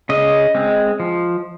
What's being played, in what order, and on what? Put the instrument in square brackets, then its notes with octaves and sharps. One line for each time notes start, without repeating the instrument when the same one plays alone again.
[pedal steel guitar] C#3 D#5
G#3 C4
F3